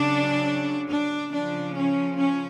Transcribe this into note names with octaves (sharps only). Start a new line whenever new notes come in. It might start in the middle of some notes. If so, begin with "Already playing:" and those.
Already playing: C#3 F#3 D4
D4
C#3 F3 D4
C#4
C#4